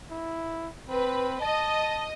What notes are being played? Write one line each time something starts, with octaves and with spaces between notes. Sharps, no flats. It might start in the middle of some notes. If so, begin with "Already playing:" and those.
E4
C4 B4
D#5 A5